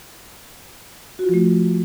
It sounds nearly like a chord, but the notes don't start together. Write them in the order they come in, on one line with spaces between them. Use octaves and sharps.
F#4 F4 F3 A3